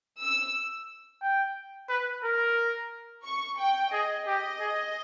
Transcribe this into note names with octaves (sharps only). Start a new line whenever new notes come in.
E6
G5
B4
A#4
C#6
G5
G#4 D#5
G4 D#5
G#4